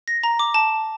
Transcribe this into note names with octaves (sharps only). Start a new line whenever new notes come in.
A#6
A#5
D6
A5